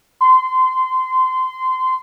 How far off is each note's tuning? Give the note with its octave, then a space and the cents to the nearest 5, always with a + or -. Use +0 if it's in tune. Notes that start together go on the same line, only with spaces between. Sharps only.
C6 -20